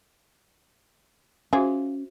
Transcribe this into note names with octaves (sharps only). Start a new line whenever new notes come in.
C#4 F4 F#4 G#4 C5 E5